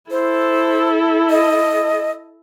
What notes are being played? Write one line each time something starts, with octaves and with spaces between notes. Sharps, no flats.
E4 A4 C5
D#5